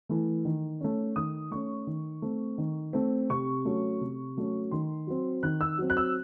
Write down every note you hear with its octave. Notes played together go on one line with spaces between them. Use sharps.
E3 A3
D#3
A3 C#4
D#3 D#6
A3 C#4 C#6
D#3
A3 C4
D#3
A3 C4
C3 C#6
F#3 A3 C#4
C3
F#3 A3 C#4
D#3 C6
F#3 C4
D#3 F#6
E6
F#3 C4
F#6
E6